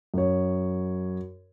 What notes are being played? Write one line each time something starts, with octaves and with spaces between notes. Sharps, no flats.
F#2 C#5